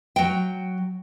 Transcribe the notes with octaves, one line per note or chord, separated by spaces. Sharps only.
F#3 G5